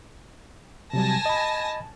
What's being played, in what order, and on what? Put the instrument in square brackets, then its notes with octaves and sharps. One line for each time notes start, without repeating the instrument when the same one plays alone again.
[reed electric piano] C3 F#3 G3 [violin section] G#5 A5 A#6
[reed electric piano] D#5 B5